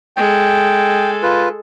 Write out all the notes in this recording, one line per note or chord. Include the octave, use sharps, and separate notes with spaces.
G#3 A4 G5
F4 B4